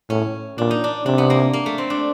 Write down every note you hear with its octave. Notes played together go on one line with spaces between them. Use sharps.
A2 C#4
A#2 D4
D#4
D4
C3 D4
B3
A#3
A#3
A3
C4
D4